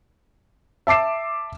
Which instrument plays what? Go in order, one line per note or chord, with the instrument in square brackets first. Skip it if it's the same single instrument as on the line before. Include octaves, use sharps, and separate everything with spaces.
[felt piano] E5 A5 D6 C7 E7